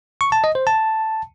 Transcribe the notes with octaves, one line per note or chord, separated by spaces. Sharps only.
C#6
A5
D#5
C5
A5